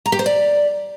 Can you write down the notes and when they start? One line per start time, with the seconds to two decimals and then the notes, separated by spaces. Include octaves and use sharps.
0.06 A#5
0.12 G4
0.19 C5
0.26 D5